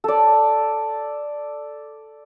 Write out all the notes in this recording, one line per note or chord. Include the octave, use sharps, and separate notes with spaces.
A4 D5